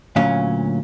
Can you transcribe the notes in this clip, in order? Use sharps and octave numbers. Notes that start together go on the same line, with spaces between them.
D2 A#2 F#3 C#4 F5